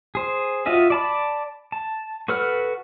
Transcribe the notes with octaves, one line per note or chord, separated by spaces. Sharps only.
G#4 C5
F4 F#4 D#5 E5
D5 A5 B5
A5
F#4 A4 B4 F#5 F6